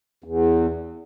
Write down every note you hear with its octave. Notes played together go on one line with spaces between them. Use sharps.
E2